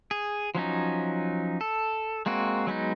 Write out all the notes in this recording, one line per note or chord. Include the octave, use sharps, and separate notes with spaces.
G#4
F3 F#3 C#4 D#4
A4
G#3 A#3 C4 F#4
F#3 G#3 B3 D#4